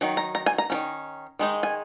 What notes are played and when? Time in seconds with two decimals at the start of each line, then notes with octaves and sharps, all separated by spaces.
0.01 D#3 F#3
0.17 A#5
0.35 A#5
0.46 G#5
0.58 A#5
0.70 D#3 F#3 C#4
1.39 D#3 G#3 D#4
1.63 G#5